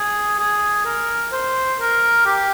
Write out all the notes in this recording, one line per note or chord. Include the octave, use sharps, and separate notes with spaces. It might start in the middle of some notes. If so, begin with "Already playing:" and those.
Already playing: G#4
G#4
A#4
C5
A#4
G4